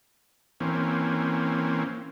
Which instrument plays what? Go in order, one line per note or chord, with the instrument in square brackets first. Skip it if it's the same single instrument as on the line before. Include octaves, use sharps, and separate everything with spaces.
[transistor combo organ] E3 A#3 C4 C#4